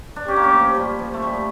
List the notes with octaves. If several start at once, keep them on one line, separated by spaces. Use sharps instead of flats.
D4
C#4 G4
A#3
C#4
F3
G3
F3
A3
G3